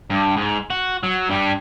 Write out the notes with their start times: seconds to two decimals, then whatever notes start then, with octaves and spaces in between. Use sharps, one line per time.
0.10 G2
0.37 G#2
0.70 F#4
1.03 F#3
1.29 G2 G3